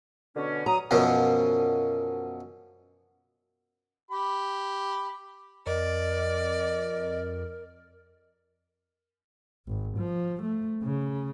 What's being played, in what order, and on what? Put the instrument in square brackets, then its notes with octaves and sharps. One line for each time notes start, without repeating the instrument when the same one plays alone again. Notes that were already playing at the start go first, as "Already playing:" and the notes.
[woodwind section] B2 D3 C#4
[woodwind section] F#3 D#6 [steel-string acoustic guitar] A#5
[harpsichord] F#2 B2 F3
[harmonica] G4 B5
[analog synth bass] F2 [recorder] A#4 [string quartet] D5 [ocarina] D#5
[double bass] G#1
F3
A3
C#3